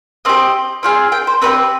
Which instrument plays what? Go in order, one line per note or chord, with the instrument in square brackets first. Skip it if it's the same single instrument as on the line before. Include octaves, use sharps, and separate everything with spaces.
[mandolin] C4 G4 D#5
C4 F4 G#4
G5
C5
C4 D#4 G4 B4